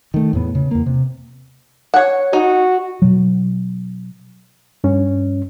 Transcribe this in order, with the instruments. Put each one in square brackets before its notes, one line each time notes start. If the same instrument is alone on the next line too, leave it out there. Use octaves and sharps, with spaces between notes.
[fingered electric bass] D#3 A3
E2 A2 B3
C#3
E2 A#3
C3
[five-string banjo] C#5 F#5
[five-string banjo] D#4 [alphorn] F#4
[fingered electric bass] B2 F#3
[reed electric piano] G2 C#4